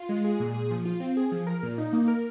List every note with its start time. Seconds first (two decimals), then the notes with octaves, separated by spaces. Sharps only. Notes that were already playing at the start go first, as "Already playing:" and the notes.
Already playing: F4
0.09 G#3
0.24 G#4
0.40 A#2
0.54 G#4
0.70 F3
0.85 F4
1.00 C4
1.17 G#4
1.32 F3
1.47 A#4
1.63 A#2
1.78 D#4
1.93 A#3
2.08 A#4